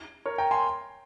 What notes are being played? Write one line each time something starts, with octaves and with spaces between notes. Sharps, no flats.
A#4 C#5
G5 A#5
G#5 C6